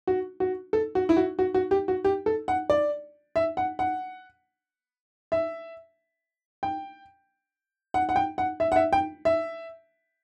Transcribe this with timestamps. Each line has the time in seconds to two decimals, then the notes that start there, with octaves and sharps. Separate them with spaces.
0.07 F#4
0.40 F#4
0.73 A4
0.95 F#4
1.09 E4
1.17 F#4
1.39 F#4
1.54 F#4
1.71 G4
1.88 F#4
2.05 G4
2.26 A4
2.48 F#5
2.70 D5
3.36 E5
3.57 F#5
3.79 F#5
5.32 E5
6.63 G5
7.94 F#5
8.09 F#5
8.16 G5
8.38 F#5
8.60 E5
8.72 F#5
8.76 E5
8.93 G5
9.25 E5